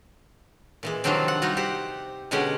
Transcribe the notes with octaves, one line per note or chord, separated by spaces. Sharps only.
A#2 E3 G#3
C3 D#3 F3 F#3 C4 D4
F#5
G3 D#4 F4 F#4
G4 C5 F#5
B2 D3 G#3 C#4 G4 F#5